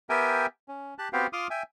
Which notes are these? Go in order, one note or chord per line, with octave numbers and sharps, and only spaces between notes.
B3 G4 A#4 E5 G5 G#5
C#4
G4 A5 F#6
B3 C4 F#4 G4 F5 G5
F4 C6 D6 D#6 F6
E5 G5 G#5